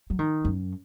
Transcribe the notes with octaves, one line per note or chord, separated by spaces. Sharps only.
F#3
D#3
F#2